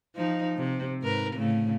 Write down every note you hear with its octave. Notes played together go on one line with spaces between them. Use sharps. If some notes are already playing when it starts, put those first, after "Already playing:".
F3 D#4
C3
G#2 A#4 B4
A2 C#3 A3